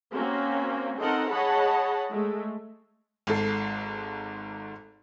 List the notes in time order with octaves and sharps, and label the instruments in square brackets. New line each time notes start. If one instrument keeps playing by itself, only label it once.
[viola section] A#3 C4 C#4 F#4
C4 D#4 A4 A#4 D#5 F#5
G#4 C#5 D#5 F#5 A5 B5
G#3 A3
[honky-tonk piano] G#1 G#2 A4 C7